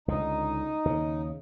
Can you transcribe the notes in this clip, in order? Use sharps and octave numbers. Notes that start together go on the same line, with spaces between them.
C#2 D3 D#4
D#2 C#3